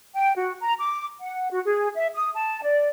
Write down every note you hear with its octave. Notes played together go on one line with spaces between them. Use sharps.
G5
F#4
A#5
D6
F#5
F#4
G#4
E5
D#6
A5
D5